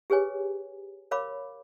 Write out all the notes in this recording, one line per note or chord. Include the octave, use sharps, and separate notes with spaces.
G4 G#4 B4 C#5 G#5
A#4 C#5 F5 B5 D6